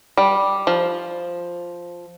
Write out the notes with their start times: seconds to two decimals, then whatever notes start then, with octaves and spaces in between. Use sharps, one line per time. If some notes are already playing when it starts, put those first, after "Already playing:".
0.17 G3
0.67 F3